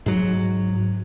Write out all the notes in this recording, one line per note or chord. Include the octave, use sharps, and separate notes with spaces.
G#2 F#3